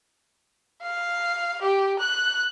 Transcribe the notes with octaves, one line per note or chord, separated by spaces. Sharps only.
F5
G4
F#6